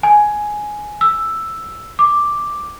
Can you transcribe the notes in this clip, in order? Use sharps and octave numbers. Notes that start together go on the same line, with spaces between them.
G#5
E6
D6